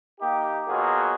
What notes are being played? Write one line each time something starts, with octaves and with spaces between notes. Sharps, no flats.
A#3 D#4 G4
B2 F#3 A#3 F4 G#4